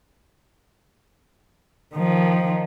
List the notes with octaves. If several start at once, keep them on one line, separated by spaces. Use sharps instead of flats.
D#3 F3